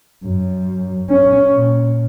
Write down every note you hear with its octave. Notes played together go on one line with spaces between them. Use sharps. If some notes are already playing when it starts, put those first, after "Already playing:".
F#2
C#4
A#2